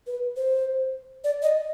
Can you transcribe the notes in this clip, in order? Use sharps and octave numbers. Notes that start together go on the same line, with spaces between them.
B4
C5
D5
D#5